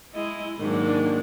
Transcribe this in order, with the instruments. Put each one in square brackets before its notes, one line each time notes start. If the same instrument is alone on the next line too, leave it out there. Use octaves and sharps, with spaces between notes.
[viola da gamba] G#3 D#5 [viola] E4
[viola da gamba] G#2 F#3 A#3 [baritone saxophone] D#3 [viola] G#3 D4